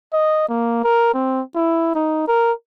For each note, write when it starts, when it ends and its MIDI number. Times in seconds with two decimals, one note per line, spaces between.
0.13 0.47 75
0.49 0.84 58
0.84 1.14 70
1.14 1.41 60
1.55 1.92 64
1.95 2.23 63
2.28 2.52 70